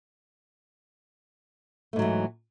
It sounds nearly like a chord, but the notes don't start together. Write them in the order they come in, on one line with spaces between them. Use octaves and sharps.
A3 G#2 F#3 E3